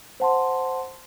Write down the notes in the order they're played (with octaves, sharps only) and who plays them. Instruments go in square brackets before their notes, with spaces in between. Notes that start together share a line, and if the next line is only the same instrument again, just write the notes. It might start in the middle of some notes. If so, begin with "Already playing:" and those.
[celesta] C5 F#5 A5 C6